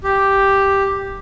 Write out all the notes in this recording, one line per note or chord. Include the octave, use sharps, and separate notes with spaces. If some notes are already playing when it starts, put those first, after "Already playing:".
G4